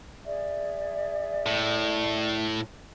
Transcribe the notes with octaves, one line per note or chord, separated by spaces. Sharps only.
G#4 D5 E5
A2